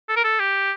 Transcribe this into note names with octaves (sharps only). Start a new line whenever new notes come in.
A4
A#4
A4
G4